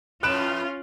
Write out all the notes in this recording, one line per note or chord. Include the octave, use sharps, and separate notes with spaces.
F2 A2 C#4 F4 B4 F#6 D7 E7